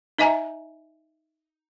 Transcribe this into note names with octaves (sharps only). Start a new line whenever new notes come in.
D#4 D#5 E5 G#5 A#5